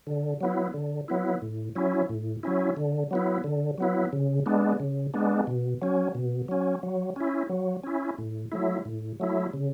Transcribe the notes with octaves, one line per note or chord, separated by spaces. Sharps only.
D3
F#3 B3 E4
D3
F#3 B3 E4
A2
F#3 C#4 E4
A2
F#3 C#4 E4
D3
F#3 B3 E4
D3
F#3 B3 E4
C#3
G#3 B3 D4
C#3
G#3 B3 D4
B2
F#3 C#4
B2
F#3 C#4
F#3
C#4 E4
F#3
C#4 E4
A2
F#3 A3 E4
A2
F#3 A3 E4
C#3